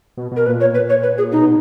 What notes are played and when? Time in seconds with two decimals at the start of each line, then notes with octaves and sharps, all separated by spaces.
0.17 B2
0.32 B2 A#4
0.46 A#2 B4
0.61 C#5
0.75 B4
0.89 C#5
1.03 B4
1.18 G#4
1.32 B2 D#4